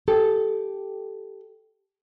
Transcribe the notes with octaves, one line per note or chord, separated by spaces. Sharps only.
G4 A4